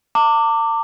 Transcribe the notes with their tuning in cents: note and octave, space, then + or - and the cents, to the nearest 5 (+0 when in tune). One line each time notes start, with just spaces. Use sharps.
A5 +45 D6 +0